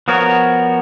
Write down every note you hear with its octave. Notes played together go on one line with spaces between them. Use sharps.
F3 B3 F#4 A#4 C#5